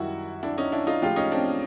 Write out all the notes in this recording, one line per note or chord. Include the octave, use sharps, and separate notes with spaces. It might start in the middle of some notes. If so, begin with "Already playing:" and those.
Already playing: F#2 D#3 G3 E4 F#4
D4 E4
C#4 D#4
D4 E4
D#4 F4
A2 F3 G#3 F4 G4
C#4 D#4
C4 D4